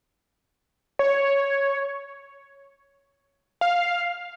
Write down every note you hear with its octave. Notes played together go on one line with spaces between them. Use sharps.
C#5
F5